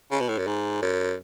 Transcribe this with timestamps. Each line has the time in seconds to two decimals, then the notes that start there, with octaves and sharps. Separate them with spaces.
0.11 C#3
0.20 B2
0.29 A2
0.38 F#2
0.47 G#2
0.82 F#2